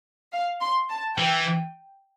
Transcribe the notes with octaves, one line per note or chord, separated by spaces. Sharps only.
F5
C6
A5
E3 G5